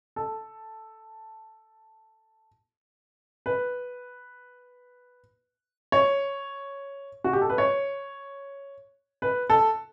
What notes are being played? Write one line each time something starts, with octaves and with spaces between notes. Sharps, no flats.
A4
B4
C#5
F#4
G4
A4
B4
C#5
B4
A4